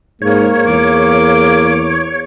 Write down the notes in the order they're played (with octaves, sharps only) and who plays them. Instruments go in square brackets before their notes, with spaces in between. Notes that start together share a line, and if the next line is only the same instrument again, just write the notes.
[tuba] G#2 [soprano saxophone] A#3 [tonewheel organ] C#5
[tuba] E2 [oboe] D6